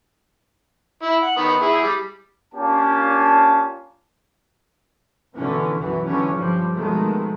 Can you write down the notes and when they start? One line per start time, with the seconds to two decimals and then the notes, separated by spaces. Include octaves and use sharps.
1.03 E4
1.23 F#5
1.36 D#3 B3
1.61 E4 G#4
1.83 G3
2.54 A#3 C#4 D4 F4 G4 A5
5.36 G2 B2 D3 E3 C#4
5.74 B1 F#2 B2 E3 F#3
6.04 D3 E3 F#3 G3 C#4
6.33 G1 G2 F3 G3
6.73 B2 D#3 F3 G#3 A3